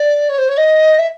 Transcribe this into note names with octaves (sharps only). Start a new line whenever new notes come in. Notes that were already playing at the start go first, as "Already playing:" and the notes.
Already playing: D5
C#5
C5
C#5
D#5
E5